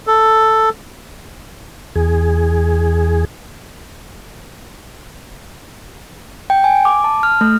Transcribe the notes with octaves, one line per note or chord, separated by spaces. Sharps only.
A4
E2 G#4
G5
G#5
D6
A5
F6
A3